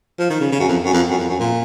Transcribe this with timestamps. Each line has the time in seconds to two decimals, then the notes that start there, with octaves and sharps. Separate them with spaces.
0.19 F3
0.30 D#3
0.40 C#3
0.52 C#3
0.60 F#2
0.68 F2
0.85 F#2
0.93 F2
1.10 F#2
1.19 F2
1.29 F#2
1.40 A#2